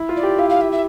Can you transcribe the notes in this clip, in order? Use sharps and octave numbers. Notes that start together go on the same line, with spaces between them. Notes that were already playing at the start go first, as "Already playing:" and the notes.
Already playing: E4
F4
D5
G4
E4 F5
F5
E5
E5